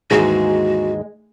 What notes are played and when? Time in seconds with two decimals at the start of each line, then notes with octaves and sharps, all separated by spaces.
0.11 D#2 G#2 E3 G#3 F#4